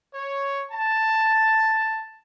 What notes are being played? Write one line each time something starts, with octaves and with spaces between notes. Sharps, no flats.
C#5
A5